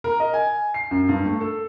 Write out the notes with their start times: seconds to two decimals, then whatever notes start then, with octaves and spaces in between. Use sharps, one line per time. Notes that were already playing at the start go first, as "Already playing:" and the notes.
0.04 A#4
0.20 D#5
0.34 G#5
0.74 C7
0.91 F#2
1.09 G2
1.26 A3
1.40 A4